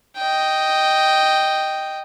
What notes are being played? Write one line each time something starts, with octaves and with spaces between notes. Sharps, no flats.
D#5 G5